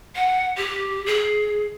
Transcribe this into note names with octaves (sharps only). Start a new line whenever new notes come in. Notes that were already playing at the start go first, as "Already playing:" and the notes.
F#5
G4
G#4